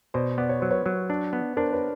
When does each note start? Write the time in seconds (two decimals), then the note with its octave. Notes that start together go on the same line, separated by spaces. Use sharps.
0.14 B2 C5 D5
0.38 B3 D5
0.49 C#5
0.60 F#3 C5
0.71 B4 C#5
0.86 F#3
1.10 D4
1.33 B3
1.57 D4 A#4 C5
1.73 B4 C#5